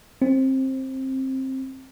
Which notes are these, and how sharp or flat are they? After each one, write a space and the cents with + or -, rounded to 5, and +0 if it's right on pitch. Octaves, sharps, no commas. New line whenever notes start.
C4 +20